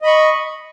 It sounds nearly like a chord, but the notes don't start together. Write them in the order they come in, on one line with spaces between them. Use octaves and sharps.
D#5 B5 C#6